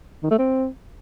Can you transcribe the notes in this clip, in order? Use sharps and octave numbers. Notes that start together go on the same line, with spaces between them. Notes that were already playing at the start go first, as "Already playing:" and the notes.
D#3
A3
C4